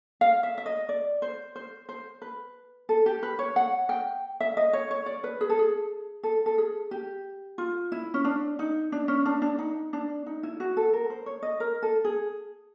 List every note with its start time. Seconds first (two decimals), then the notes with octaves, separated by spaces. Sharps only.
0.21 F5
0.43 E5
0.58 E5
0.66 D#5
0.89 D5
1.22 C5
1.56 C5
1.89 C5
2.22 B4
2.89 A4
3.06 G4
3.23 B4
3.39 C#5
3.56 F#5
3.89 G5
4.40 E5
4.57 D#5
4.73 C#5
4.91 C#5
5.06 D5
5.24 B4
5.41 G#4
5.50 A4
5.59 G#4
6.23 A4
6.46 A4
6.58 G#4
6.91 G4
7.58 F4
7.92 E4
8.14 C#4
8.24 D4
8.59 D#4
8.92 D4
9.08 C#4
9.25 D4
9.42 D4
9.59 D#4
9.93 D4
10.26 D#4
10.43 E4
10.60 F#4
10.77 A4
10.93 A#4
11.10 C5
11.26 C#5
11.43 D#5
11.60 A#4
11.82 A4
12.04 G#4